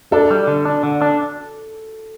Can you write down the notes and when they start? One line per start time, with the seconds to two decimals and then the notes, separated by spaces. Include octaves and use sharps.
0.12 D4 A4
0.31 G3
0.47 D3
0.65 D4
0.83 D3
1.02 D4